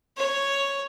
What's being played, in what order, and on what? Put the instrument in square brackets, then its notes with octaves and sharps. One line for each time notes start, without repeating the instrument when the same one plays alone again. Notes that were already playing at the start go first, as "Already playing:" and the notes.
[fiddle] C#5